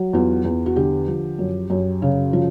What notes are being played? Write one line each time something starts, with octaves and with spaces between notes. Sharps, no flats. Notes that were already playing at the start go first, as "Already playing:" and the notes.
Already playing: F#3
E2 F4
E2
F#4
D3 G4
F3
F#2
F#2
C#3
F3